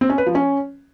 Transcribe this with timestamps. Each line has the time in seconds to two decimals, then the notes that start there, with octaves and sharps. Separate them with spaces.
0.01 C4
0.10 C#4
0.18 B4
0.26 F3
0.35 C#4